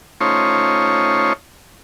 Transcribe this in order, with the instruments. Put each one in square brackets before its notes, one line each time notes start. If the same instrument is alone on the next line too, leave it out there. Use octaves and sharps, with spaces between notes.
[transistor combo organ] A3 C#4 D#4 F4 C5 C#5